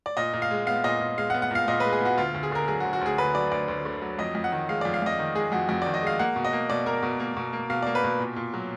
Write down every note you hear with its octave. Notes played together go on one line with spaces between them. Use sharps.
D5
A#2 D#5
A#2
F5
G#3
B3 F5
A#2 D#5
A#2
G#3 F5
F#5
B3
F#5
A#2 F5
A#2 D#5
G#3 B4
G#4
B3 F#4
D2 F4
D2
G#4
D3 A#4
F#3 G#4
F#4
D2
F#4
D2 G#4
D3 B4
F#3 D5
D2 D5
D2
D3
F#3
F2 D#5
F2
F#5
D#3
G#3 F5
F2 D5
F5
F2 D#5
D#3
G#3 G#4
F2 F#4
F2 F#4
D#3 D5
D#5
G#3 F5
A#3 F#5
B2
D#5
A#3
B2 D5
A#3 A#4
B2
A#3
B2
A#3
B2 F5
A#3 D5
B4
B2
A#2
A#2
F#3